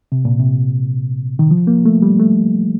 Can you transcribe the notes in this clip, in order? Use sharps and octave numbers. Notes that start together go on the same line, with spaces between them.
C3
A#2
C3
D#3
F3
A#3
A3
G3
A3